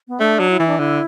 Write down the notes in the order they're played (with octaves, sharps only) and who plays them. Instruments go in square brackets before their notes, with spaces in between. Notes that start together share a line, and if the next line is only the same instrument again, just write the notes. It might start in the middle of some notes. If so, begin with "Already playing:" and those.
[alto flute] B3
[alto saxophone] A3 [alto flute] D4
[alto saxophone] F#3
[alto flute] E4
[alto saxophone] E3
[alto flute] D4
[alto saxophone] D3 [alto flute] E4